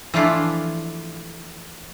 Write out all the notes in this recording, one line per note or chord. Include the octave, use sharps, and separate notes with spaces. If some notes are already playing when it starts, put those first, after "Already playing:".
E3 F3 A3 D4 E4 F4